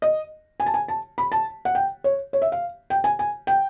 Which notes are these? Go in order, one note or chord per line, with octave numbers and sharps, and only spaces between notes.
D#5
G#5
A5
G#5
A5
B5
A5
F#5
G5
C#5
C#5
E5
F5
G5
G#5
G#5
G5